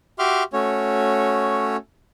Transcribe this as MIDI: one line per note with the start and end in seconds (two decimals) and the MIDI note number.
0.19 0.43 66
0.19 0.43 67
0.19 0.43 76
0.19 0.43 84
0.19 0.43 86
0.19 0.43 89
0.53 1.76 57
0.53 1.76 61
0.53 1.76 66
0.53 1.76 73